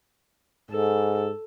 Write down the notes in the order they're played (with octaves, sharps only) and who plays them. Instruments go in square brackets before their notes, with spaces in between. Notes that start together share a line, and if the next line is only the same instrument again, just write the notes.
[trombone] G#2 [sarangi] A4